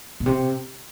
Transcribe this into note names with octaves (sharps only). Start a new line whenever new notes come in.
B2
C3